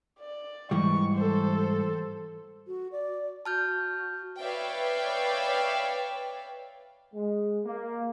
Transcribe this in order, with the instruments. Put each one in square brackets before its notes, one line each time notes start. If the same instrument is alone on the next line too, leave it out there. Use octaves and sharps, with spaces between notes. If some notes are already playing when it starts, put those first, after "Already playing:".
[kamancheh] D5
[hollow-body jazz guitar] G#2 E3 G3 [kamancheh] C#6
[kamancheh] A4 C5
[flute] F#4
D5
[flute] F#4 [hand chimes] A5 F6 G6
[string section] B4 C#5 D5 E5 F5 G5
[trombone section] G#3
A#3